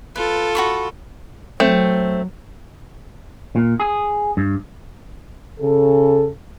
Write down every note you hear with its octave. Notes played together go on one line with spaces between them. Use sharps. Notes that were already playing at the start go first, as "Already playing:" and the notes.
F4 A4 B4
F#4 B5 C#6
F#3 A3 C4
A#2
G#4
G2
C#3 A4